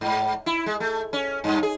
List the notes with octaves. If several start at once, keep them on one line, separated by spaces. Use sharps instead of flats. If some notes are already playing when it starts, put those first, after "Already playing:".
G#2
E4
G#3
A3
C#4
G2
G#4